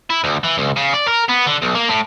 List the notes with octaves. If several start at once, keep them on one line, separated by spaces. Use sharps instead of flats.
E4
D2
E3
C#2
C#3
D5
A#4
B3
D3
B1
A#3
A2